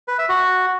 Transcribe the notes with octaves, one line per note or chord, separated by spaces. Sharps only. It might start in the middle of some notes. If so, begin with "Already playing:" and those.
B4
E5
F#4